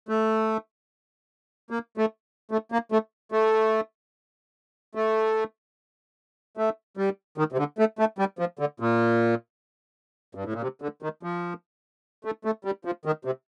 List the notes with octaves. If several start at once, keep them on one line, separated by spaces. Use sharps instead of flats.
A3
A#3
A3
A3
A#3
A3
A3
A3
A3
G3
D#3
C3
D3
A3
A3
G3
F3
D3
A#2
G2
A2
A#2
C3
D3
D#3
F3
A3
A3
G3
F3
D#3
C3